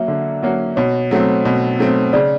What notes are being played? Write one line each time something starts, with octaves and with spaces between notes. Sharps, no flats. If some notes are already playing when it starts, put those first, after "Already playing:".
Already playing: F#3 A#3 C#4 F#4 E5
D3
F#3 A#3 C#4 F#4
B2 C#5
F#3 A3 C4
B2
F#3 A3 C4
C#3 D5